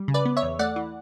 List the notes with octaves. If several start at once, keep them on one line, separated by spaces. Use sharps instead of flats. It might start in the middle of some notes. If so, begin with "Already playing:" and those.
Already playing: G3
C#3
B4 D5
B3
C#5 E5
E2
A3 D5 F#5
E3